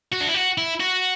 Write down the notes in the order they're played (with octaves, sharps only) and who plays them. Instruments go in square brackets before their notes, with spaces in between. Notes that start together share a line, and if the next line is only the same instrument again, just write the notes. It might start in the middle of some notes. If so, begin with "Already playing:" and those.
[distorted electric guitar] F#4
D4
E4
F#4
E4
F#4